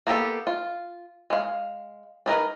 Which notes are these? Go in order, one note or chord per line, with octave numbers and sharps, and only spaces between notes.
A#3 B3 G4 A4
F4
G#3 F5
D4 D#4 A#4 B4